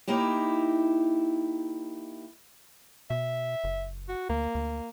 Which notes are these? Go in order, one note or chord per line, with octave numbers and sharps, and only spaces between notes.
A#3 D#4 E4 G4
B2 E5
F#1
F#4
D2 A#3
D2